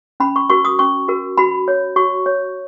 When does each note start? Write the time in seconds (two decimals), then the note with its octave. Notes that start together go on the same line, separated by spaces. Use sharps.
0.20 C#4 B5
0.36 C#6
0.50 F#4 A#4 C#6
0.65 D#6
0.79 C#4 C#6
1.08 F#4 A#4
1.38 F#4 B5
1.68 C#5
1.96 F#4 C#6
2.26 C#5